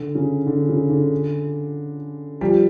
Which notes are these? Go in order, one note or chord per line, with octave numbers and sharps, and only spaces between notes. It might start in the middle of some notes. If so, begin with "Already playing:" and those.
Already playing: D3
C#3
D3
C#3
D3
F3 G3